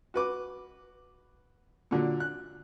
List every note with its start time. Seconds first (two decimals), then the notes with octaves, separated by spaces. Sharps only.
0.14 F#4 B4 D6
1.91 A#2 D3 F#3
2.20 F#6